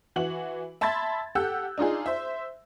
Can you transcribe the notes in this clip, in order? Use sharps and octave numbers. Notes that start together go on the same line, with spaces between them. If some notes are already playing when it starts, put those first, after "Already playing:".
E3 F#4 F#7
E5 A5 B5 C6 G#6 A6
G4 A4 F#5 E6 F#6 G6
D4 D#4 F4 G#4
C5 E5